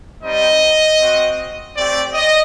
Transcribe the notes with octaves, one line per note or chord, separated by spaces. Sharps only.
G3 C4 D#4 D#5
C4 F#4
A3 C4 G4 D5
D#5